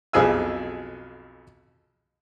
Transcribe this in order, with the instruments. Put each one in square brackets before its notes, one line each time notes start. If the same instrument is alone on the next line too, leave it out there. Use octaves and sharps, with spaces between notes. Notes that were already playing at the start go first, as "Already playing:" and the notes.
[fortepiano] B1 F2 F3 G#4 G#5 E6